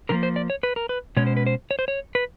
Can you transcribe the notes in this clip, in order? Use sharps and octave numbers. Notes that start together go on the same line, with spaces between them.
D3 F3 A#3 A#4
C5
D5
C#5
B4
A#4
B4
B2 G#3 C#4 C#5
C5
B4
C5
C#5
C5
C#5
B4